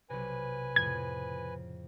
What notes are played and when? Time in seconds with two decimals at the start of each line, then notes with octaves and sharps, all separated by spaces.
0.10 B1 C3 B4 G#5
0.76 F2 A2 C#3 G#6